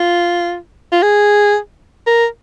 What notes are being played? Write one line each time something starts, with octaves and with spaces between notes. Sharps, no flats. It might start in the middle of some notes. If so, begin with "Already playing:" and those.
Already playing: F4
F4
G#4
A#4